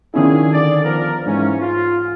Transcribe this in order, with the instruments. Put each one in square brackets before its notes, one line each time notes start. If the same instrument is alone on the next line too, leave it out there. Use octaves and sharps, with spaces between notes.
[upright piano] D#3 C#4 E4 [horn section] D4 F4 G#4
[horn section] D3 D5
F3 B3 A#4
[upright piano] G#2 [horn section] E3 A#3 C#4
[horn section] F4